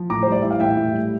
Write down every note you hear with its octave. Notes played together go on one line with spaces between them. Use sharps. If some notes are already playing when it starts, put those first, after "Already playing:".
Already playing: F3
A2 A#5 D6
C5
G3 D5
E3 E5
F5
A2 E5 G5
A2
G3